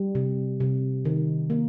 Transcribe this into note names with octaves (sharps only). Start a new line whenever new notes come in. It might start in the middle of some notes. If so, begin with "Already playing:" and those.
Already playing: G3
C3
C3
D#3
A#3